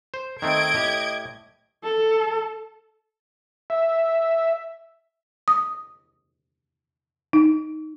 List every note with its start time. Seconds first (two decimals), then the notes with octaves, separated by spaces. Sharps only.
0.14 C5
0.42 D#3 A3 C4 D#5 G#6 D7
0.74 A2 G4
1.84 A4
3.70 E5
5.48 D#6
7.33 D#4